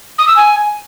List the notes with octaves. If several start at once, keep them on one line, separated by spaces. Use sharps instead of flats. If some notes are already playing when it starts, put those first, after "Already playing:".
D#6
E6
G#5